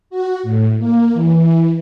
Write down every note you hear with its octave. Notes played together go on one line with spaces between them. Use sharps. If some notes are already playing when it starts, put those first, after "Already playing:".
F#4
A2
A#3
E3